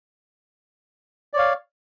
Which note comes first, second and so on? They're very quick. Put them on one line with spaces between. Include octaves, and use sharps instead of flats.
D5 C#5 F5